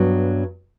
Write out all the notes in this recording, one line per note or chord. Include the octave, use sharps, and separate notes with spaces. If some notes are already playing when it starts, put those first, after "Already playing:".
Already playing: G2 F#3 B3